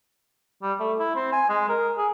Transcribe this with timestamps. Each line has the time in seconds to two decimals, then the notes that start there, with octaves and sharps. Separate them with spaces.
0.63 G3
0.80 A3
0.99 E4
1.15 C4
1.32 G#5
1.49 G#3
1.69 A#4
1.97 G#4